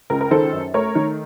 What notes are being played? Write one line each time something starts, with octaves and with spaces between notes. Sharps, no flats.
C#2 A#4
A#4
D#3 A4 C5
F#2
A3 A#4 C#5
D#3